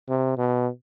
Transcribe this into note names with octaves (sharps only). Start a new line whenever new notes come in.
C3
B2